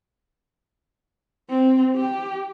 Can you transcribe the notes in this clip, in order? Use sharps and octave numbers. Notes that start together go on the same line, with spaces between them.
C4
G4